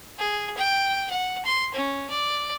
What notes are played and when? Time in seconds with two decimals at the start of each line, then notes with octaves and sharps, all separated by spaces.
0.18 G#4
0.57 G5
1.10 F#5
1.45 C6
1.74 C#4
2.10 D5